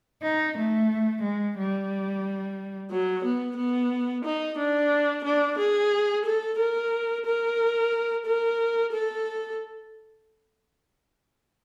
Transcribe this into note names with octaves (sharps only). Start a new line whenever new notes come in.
D#4
A3
G#3
G3
F#3
B3
B3
D#4
D4
D4
G#4
A4
A#4
A#4
A#4
A4